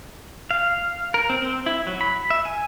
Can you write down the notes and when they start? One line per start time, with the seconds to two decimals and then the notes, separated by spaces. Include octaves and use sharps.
0.51 F5
1.14 A#4
1.30 C4
1.42 C4
1.66 E4
1.87 F#3
2.01 B5
2.30 E5
2.45 G#5